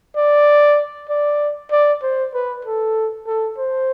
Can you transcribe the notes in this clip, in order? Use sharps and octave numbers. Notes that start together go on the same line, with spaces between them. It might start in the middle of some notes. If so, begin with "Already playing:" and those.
D5
D5
D5
C5
B4
A4
A4
C5